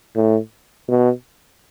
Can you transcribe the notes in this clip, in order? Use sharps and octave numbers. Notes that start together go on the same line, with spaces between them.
A2
B2